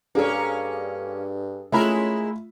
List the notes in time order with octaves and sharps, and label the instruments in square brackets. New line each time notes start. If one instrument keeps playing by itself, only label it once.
[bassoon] G2 [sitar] A#3 C#4 [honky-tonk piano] D4 G#4 A4
[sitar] G#3 E4 A#4 [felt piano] A3 F4 B5 [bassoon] C#4